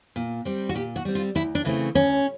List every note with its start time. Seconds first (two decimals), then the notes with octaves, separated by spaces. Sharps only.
0.16 A#2
0.45 G3 C4
0.69 F#4
0.75 A#2 G4
0.96 F#4
1.05 G3 C4
1.15 F4
1.35 D2 E4
1.55 D4
1.65 C#3 E3 A3 C4
1.95 D2 C#4